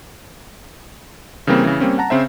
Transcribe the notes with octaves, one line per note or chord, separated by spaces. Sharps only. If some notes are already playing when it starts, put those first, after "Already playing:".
C#3 E3 G3 A#3 C4
C#3 E3
G3 A#3 C4 C#4
F#5 A5 A#5
C#3 C4 C5 E5